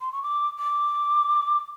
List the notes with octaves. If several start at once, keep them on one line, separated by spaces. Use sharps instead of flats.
C6
C#6
D6
D6